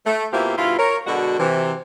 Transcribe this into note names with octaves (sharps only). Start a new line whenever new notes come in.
A3
B2 A#3 C4 E4 F4 G4
G2 B2 E4 F4
A#4 C#5
B2 D3 G#3 F#4
C3 E3